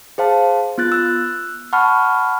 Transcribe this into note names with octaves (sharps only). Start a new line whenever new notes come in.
G#4 C5 F5 A5
B3 F4 F#6 A6
E6 F#6
F#5 A5 B5 C#6 F6